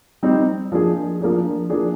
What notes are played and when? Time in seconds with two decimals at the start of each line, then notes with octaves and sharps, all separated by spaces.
0.23 G3 C4 D#4
0.72 F3 A#3 D4 G#4
1.21 F3 A#3 D4 G#4
1.70 F3 A#3 D4 G#4